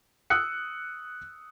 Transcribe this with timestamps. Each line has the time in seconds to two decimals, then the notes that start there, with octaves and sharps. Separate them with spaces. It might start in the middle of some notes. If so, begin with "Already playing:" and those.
0.30 D#6 E6 F#6 C#7